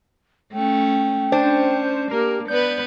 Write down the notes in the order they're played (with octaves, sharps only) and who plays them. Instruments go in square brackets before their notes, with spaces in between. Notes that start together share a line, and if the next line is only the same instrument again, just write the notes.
[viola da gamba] A3 C#4 [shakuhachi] G5
[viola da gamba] C#4 [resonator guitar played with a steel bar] D4 [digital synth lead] C5
[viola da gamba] A#3 [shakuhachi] G4 [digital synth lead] A#4
[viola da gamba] B3 B4 [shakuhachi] D5 [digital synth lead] G6